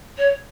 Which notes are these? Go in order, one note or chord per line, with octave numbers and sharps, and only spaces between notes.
C#5